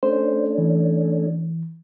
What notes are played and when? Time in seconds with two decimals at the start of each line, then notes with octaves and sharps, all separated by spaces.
0.03 A3 C#4 D4 C5
0.58 E3